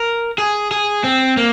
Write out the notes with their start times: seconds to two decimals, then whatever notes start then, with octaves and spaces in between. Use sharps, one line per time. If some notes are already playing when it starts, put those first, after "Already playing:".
Already playing: A#4
0.38 G#4
0.71 G#4
1.04 C4
1.37 A#3